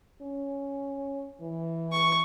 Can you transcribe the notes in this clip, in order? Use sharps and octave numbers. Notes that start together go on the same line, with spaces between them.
C#4
E3
C#6